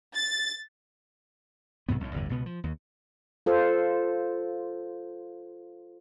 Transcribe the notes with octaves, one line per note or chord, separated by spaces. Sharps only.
A6
B1 G#2 C3 B3
B1 A2
G1 E2 A2 D3
C#2 B2 B3
F3
D#2
F4 A4 C5